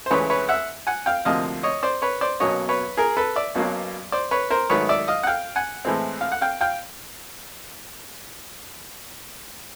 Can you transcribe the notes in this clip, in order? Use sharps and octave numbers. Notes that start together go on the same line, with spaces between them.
C5
C#2 C#3 E3 A3 B4 C#5
B4 C#5
E5 F#5
F#5 G#5
F5 G5
D2 C3 F3 A#3 D#5 F5
C#5 D#5
C5 D5
B4 C#5
C5 D5
B1 B2 F#3 A#3 C#4 C#5 D#5
B4 C#5
G#4 A#4
A4 B4
D5 E5
B1 B2 F#3 A#3 C#4
C5 D5
B4 C#5
A#4 C5
G#2 D#3 F#3 A3 B4 C#5
D5 E5
D#5 F5
F#5
F5 G5
F#5 G#5
A2 E3 G#3 C4
F5
F#5
F5 G5
F5 G5